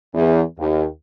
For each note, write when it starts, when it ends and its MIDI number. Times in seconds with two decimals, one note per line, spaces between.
0.14 0.42 40
0.58 0.85 39